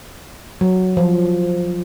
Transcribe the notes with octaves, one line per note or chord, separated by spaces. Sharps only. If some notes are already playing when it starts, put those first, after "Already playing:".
F#3
F3